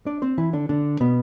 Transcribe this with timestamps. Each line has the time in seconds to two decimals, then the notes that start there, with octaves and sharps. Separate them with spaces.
0.06 D4 D5
0.22 C4 C5
0.38 E3 E4
0.53 D3 D4
0.69 D3 D4
1.00 B2 B3